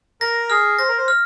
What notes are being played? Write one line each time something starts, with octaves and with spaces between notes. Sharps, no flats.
A#4 A#6
G#4 F6
C5 A#6
A#4
C5
F6